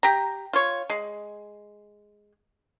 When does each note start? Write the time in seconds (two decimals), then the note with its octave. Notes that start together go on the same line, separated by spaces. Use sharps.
0.03 G4 A#5
0.53 F4 C#5
0.90 G#3